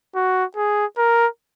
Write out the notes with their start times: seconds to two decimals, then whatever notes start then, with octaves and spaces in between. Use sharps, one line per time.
0.16 F#4
0.57 G#4
0.98 A#4